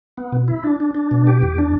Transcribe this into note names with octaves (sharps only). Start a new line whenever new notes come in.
B3
B2
E4
D4
D4
D4
B2
G4
E2
D4